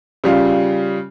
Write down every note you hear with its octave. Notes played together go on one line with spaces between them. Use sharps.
C#3 G3 F4